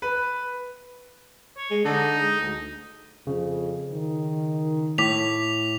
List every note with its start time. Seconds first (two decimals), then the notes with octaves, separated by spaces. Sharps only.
0.02 B4
1.57 C#5
1.70 G#3
1.85 D3 D#4
2.20 G#3
2.40 D2
3.27 F2 C#3
3.92 D#3
4.98 A2 D6 B6 F7